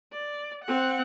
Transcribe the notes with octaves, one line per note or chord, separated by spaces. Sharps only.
D5
C4 F#5